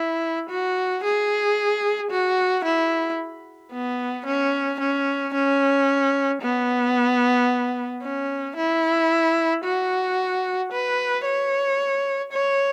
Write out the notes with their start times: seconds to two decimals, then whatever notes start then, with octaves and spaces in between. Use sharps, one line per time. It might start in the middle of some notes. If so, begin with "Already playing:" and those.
Already playing: E4
0.49 F#4
1.04 G#4
2.11 F#4
2.65 E4
3.72 B3
4.26 C#4
4.80 C#4
5.34 C#4
6.42 B3
8.03 C#4
8.56 E4
9.64 F#4
10.72 B4
11.25 C#5
12.33 C#5